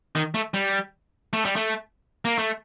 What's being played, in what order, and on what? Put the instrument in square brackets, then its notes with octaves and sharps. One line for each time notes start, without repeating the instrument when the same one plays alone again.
[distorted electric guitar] D#3
A3
G3
A3
G3
A3
A#3
A3